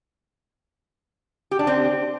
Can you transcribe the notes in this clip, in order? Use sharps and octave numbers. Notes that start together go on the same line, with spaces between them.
G4
D4
C4